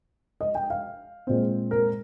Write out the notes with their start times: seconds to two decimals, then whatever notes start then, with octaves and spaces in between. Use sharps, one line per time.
0.41 D#5
0.55 G5
0.70 F5
1.27 A#2 G#3 C4
1.71 A#4